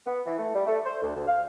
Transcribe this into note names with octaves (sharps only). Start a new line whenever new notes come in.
B3
E3
A3
G3
A3
C5
D2
D2
F5